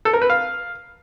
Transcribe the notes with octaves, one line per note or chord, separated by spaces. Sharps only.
A4
A#4
B4
F5